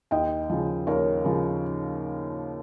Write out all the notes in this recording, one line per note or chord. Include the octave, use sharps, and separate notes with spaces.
D#2 D#5 G5
C#3 F3
D#2 A#4 C#5
C#3 F3